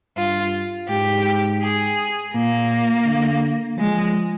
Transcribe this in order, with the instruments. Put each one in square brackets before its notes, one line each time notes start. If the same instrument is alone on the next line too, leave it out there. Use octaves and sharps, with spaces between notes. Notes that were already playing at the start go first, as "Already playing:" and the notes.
[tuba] G2 [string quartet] F4
[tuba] G#2 [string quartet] G4
[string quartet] G#4
[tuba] A#2 [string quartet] A#3
[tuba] D3
[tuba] F3 [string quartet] G#3